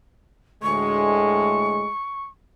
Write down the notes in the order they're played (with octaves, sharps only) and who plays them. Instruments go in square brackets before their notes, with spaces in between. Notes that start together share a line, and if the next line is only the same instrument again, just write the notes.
[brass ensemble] D2 A2 G#3 [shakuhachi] C#6